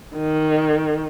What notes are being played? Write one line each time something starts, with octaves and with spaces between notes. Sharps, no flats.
D#3